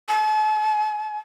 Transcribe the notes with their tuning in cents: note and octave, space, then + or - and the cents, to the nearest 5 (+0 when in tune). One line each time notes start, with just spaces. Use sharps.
A5 -45